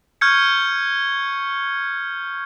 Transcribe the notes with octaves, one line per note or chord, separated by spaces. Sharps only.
C#6 F6 G6 G#6 C#7